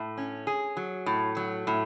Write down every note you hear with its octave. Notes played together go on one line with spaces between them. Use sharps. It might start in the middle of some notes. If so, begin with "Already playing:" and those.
Already playing: A2
C#4
G#4
F#3
A2
F#3
A2